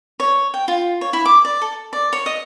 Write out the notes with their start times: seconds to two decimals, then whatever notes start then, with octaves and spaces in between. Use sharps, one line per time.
0.20 C#5
0.54 G5
0.68 F4
1.01 C#5
1.13 E4
1.26 D6
1.45 D5
1.62 A4
1.93 D5
2.13 C#5
2.26 D#5